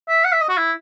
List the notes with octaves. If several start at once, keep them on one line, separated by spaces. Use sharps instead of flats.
E5
F#5
E5
D#5
F#4
E4